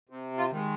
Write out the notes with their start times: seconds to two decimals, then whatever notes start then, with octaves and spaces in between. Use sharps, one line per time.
0.09 C3
0.38 F4
0.51 D#3 G#3